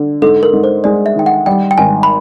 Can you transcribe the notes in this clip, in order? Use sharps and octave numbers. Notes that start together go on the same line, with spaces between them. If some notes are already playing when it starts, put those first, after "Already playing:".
Already playing: D3
G#2 A4
A#4
G#2
C5
G#3 D5
E5
D#3 G5
F#5
G3 G5
G5
G#1 G#5
B5